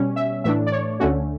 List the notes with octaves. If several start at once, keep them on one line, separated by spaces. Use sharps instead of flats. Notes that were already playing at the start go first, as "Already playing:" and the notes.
Already playing: B2 G3 C#4
E5
A2 E3 A3 D4 E5
D5
C#5
D2 D3 A3 C#4 F#4